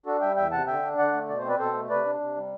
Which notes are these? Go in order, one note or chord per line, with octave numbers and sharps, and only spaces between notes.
D4 F#4 A4
G3 E5 G5
E2 E5 G5
C3 F#5 A5
D3 E5 G5
D4
D3 D5 F#5
A3
B2 D5
C5
C4 B4 D5
B2 A4 C5
A3
C3 B4 D5
D4
C3
G3